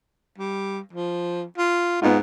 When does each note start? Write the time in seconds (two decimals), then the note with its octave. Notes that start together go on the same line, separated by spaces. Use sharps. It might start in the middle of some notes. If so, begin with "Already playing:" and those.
0.38 G3
0.93 F3
1.58 F4
2.02 G#2 B3 D#4 F4